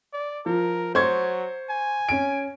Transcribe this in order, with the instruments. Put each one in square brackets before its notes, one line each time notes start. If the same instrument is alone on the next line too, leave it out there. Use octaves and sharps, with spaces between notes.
[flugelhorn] D5
[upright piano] F3 [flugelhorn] A#4
[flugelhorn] F#3 [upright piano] C5 C#6 G#6
[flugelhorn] G#5
[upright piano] C#4 D7